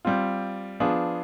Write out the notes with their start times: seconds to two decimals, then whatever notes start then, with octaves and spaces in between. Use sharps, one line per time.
0.05 G3 C4 F4
0.80 F3 B3 D4 F4 G#4